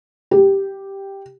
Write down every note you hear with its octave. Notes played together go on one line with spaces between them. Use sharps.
G4